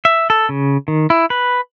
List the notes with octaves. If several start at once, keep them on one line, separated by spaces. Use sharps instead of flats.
E5
A4
C#3
D#3
E4
B4